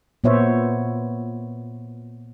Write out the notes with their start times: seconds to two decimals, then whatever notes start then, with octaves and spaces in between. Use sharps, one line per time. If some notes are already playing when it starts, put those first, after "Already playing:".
0.24 A#2 B3 C5 C#5 E5